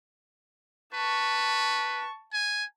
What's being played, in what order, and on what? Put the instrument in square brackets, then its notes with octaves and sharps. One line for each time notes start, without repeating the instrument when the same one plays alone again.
[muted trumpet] B4 [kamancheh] A5 C#6
[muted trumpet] G#5